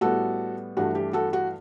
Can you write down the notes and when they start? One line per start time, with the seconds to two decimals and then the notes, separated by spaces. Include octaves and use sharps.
0.01 A2 G3 B3 F#4 A4
0.77 G2 E3 A3 F#4
0.95 G4
1.13 F#4 A4
1.33 F#4